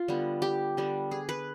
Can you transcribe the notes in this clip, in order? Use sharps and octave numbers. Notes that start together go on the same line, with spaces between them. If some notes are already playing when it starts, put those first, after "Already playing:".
Already playing: F4
D3 G3 B3
G4
D3 G3 B3
G#4
B4